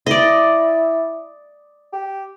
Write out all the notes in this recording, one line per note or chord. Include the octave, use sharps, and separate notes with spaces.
E4 D5 D#5
G4